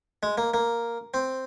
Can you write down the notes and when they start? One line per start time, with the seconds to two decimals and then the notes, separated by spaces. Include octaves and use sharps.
0.23 G#3
0.38 A#3
0.54 A#3
1.14 C4